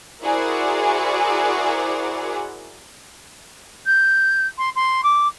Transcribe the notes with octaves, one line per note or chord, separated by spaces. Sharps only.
E4 F#4 G#4 A#4 C5 D5
G6
C6
C6
D6